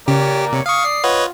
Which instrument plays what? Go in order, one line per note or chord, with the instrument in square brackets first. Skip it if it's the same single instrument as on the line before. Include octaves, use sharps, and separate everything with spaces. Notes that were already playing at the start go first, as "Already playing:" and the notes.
[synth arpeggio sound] C#3 [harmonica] A#3 D5 A#5 [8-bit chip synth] G4 [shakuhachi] C#5
[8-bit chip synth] C3 [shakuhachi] C#5
[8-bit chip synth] F5 C#6 [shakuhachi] D#6
[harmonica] D5 [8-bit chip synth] C7
[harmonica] F4 [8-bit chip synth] B4 C#5 D#5 [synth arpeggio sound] F#5